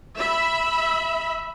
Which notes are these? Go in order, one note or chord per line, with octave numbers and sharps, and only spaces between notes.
E5 B5